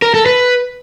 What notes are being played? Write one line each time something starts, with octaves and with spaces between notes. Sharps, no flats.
A#4
A4
B4